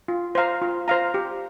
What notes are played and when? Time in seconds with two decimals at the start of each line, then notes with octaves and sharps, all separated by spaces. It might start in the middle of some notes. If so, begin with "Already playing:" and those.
0.08 F4
0.35 C5 F5 A#5
0.62 F4
0.88 C5 F5 A#5
1.14 G4